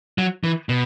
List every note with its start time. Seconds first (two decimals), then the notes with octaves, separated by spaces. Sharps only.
0.18 F#3
0.44 E3
0.69 B2